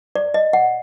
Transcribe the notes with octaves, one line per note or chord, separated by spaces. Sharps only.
D5
D#5
F#5